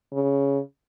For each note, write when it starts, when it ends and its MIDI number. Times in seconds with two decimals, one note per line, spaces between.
0.13 0.59 49